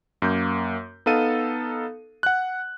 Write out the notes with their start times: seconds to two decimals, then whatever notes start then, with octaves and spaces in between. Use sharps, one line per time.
0.22 F#2 A#3 G6
1.06 B3 D#4 A4 F5 D#7
2.23 F#5 F#6